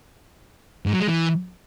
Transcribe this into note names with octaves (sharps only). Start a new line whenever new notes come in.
G#2
F#3
G#3
E3